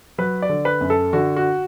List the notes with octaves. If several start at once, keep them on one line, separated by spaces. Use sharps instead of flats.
F#3 B4
D5
D3
B4
F#2
A4
D3 F#4
F#4